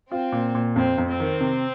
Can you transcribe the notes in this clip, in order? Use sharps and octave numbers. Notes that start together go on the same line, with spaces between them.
C4 F4
A#2
A#2
F2 C4
F2
C4
D#3
C3